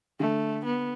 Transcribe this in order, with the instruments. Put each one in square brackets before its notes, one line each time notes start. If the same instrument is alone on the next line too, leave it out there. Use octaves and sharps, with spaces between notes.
[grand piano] D3 [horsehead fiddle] A3
[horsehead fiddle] B3